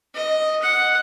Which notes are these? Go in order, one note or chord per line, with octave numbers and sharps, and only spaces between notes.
D#5
F#5